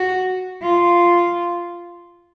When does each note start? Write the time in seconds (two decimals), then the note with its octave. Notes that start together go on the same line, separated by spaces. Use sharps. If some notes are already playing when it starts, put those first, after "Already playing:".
Already playing: F#4
0.63 F4